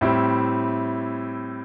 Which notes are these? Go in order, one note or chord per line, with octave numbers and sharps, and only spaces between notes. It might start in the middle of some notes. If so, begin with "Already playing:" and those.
A2 G3 C4 E4